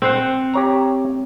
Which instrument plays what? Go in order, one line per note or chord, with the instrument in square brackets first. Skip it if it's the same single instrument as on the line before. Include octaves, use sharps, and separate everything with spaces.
[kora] C4 C5 F#5
[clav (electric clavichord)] G4 C#5 A#5